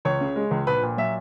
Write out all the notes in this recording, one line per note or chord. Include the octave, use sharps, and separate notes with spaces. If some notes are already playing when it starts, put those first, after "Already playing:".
C#2 C#5
C#3
G#3
C#2
A#1 B4
A#2
F#3 E5